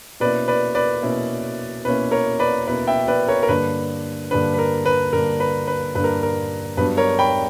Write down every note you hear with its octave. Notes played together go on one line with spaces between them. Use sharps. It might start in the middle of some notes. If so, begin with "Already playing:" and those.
B2 A#3 C#4 E4 B4 D5
B4 D5
B4 D5
B2 A#3 C#4 E4
B2 A#3 C#4 E4 B4
A#4 C#5
B4 D5
B2 A#3 C#4 E4 B4
E5 G5
B4 D5
A#4 C#5
A#4
G2 D3 A#3 D4 B4
G2 D3 A#3 D4 B4
B4
A#4
B4
G2 D3 A#3 D4 A#4
B4
B4
G2 D3 A#3 D4 B4
A#4
A#4
G2 F#3 B3 D4 B4
A#4 C#5
G5 B5